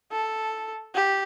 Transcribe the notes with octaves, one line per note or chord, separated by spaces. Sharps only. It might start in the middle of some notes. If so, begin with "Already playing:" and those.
A4
G4